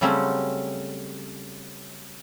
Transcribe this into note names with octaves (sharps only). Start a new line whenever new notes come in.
C#3 F#3 G3 A3 C4 C#4